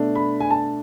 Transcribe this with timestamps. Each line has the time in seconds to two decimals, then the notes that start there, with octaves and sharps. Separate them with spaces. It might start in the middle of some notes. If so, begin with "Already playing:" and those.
Already playing: B2 A3 D4
0.15 B5
0.40 G#5
0.51 A5